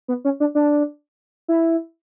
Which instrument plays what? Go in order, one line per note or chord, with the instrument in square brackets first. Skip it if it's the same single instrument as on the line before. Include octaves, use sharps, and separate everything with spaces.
[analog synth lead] B3
C#4
D4
D4
E4